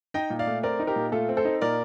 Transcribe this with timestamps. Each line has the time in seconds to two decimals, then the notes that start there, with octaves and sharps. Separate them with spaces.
0.14 D#4 D#5 G5
0.30 A#2
0.39 D5 F5
0.47 A3
0.63 C4 A#4 D5
0.79 D#4
0.87 G4 A#4
0.96 A#2
1.12 A3 F4 A4
1.29 C4
1.37 A4 C5
1.45 D#4
1.61 A#2 A#4 D5